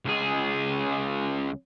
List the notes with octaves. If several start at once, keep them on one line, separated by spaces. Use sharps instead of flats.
C#2 G#4